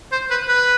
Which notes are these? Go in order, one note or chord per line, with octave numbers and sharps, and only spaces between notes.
C5
B4
B4